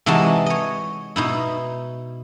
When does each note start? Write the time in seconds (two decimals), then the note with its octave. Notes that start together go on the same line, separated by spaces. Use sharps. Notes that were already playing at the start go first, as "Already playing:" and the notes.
0.06 C3 E3 G#3 D#4 F#4 A5
0.46 C#5 D#5
1.16 B2 D#4 E4